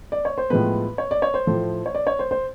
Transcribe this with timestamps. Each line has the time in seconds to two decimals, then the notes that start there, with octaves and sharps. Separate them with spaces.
0.12 D5
0.25 C#5
0.38 C5
0.50 A2 F3 G#3 B3 B4
0.98 C#5
1.11 D5
1.22 C#5
1.34 C5
1.47 A2 F3 A3
1.86 C#5
1.95 D5
2.07 C#5
2.19 C5
2.31 C5